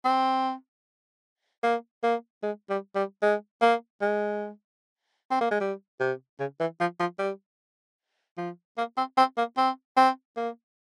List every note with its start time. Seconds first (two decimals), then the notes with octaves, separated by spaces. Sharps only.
0.05 C4
1.63 A#3
2.03 A#3
2.43 G#3
2.70 G3
2.95 G3
3.22 G#3
3.62 A#3
4.01 G#3
5.31 C4
5.41 A#3
5.51 G#3
5.60 G3
6.00 C3
6.39 C#3
6.60 E3
6.80 F3
7.00 F3
7.19 G3
8.37 F3
8.77 A#3
8.97 C4
9.18 C4
9.37 A#3
9.57 C4
9.97 C4
10.37 A#3